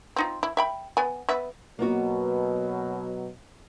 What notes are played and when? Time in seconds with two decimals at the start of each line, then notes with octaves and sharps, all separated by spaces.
0.16 C4 D#4 F4
0.43 E4
0.57 E5 G5 B5
0.97 B3 G#5
1.29 B3 B4 E5
1.79 B2 F#3 A#3 B3 F#4